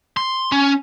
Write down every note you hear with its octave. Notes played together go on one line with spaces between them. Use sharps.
C6
C#4